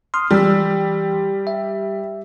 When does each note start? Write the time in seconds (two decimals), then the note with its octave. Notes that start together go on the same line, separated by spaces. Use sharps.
0.14 C6 D#6 F6
0.31 E3 G3 C6 E6
1.47 E5